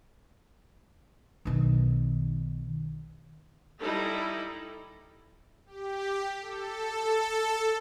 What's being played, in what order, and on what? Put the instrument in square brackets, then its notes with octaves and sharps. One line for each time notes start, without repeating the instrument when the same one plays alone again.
[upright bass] B1 D#3
[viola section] G3 D#4 E4 A4
[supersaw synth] G4
A4